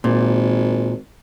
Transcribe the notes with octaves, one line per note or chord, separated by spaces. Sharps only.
G#1 A#2